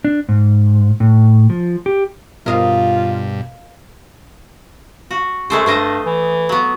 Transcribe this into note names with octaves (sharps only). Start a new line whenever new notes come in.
D4
G#2
A2
F3
G4
G2 B2 F4 A#4 D#5 F5
F#4
F#2 G#3 A3 C5
G2 A3 C5 D#5
E3
F#3 B3